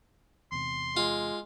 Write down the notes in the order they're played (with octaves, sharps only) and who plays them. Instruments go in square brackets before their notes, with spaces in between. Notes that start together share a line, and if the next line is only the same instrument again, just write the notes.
[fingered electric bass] E2 C3 [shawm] C6
[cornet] G#3 [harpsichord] F4